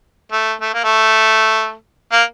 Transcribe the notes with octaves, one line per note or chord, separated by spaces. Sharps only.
A3
A3
A#3
A3
A#3